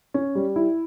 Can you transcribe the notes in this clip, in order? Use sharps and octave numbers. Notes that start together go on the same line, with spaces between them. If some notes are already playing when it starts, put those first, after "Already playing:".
C#4
G3
E4